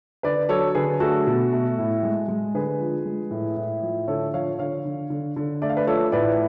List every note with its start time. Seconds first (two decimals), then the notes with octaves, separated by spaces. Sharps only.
0.23 D3 B4 D5
0.49 F#3 A4 C#5
0.75 D3 G#4 B4
1.00 A3 F#4 A4
1.27 B2
1.53 A3
1.78 A2
2.03 G#3
2.28 G#3
2.54 D3 G#4 B4
2.80 F3
3.05 G#3
3.31 A2
3.57 A2
3.82 F3
4.08 D3 A4 C#5
4.34 F3 C#5 F5
4.59 D3 C#5 F5
4.85 D3
5.10 D3
5.36 D3
5.62 A3 D5
5.69 F5
5.77 B4 D5
5.87 F3 A4 C#5
6.12 A2 B4 D5